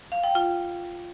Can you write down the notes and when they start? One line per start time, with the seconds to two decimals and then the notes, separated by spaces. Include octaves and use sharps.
0.12 F5
0.23 G5
0.35 F4